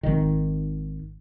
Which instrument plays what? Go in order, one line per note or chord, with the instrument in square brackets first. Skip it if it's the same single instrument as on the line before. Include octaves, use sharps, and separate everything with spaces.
[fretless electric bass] G#1 D#3